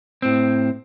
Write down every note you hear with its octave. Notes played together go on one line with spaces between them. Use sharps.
A2 C4